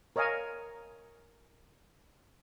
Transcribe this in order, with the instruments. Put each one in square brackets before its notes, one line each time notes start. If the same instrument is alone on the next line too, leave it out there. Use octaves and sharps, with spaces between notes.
[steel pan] A#4 C#5 D#5 F5 G#5